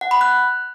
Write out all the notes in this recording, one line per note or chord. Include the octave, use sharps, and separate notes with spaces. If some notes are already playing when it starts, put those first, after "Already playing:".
F#5
B5
F#6